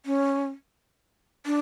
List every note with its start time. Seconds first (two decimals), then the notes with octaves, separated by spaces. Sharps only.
0.06 C#4
1.46 D4